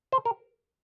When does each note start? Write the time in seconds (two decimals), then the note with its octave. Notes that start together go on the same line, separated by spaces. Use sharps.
0.12 C5
0.25 A#4